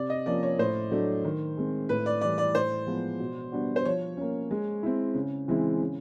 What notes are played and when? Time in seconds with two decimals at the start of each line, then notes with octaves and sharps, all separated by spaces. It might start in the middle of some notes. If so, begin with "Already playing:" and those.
Already playing: C3 D5
0.10 D#5
0.26 F3 A#3 C#4 D5
0.43 C#5
0.58 A2 C5
0.91 F#3 A3 D4
1.25 D#3
1.57 G#3 C4
1.89 A2 B4
2.06 D5
2.21 E3 G3 D5
2.38 D5
2.55 A2 C5
2.87 F3 G#3 B3
3.20 B2
3.52 G3 B3 D4 F#4
3.76 C5
3.85 F3 C#5
4.17 A#3 C#4
4.51 G#3
4.83 C4 E4
5.15 C#3
5.48 E3 G#3 C4 E4
5.81 C#3